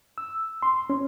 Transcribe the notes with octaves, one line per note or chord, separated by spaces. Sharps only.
E6
C6
C#4